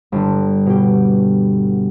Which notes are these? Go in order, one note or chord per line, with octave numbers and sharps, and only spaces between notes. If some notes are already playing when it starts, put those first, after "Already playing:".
G1 D3
B2 G4